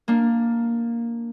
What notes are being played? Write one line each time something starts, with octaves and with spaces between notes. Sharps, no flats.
A#3 D4